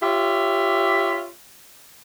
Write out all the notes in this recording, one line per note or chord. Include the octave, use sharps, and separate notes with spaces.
F4 G4 C#5 E5